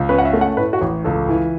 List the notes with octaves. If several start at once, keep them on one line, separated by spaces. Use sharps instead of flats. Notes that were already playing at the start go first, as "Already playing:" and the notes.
Already playing: C#2
C#4 B4
F#5
E5
A3
F#5
A2 B4
F#4
A1
C#2 A4
E3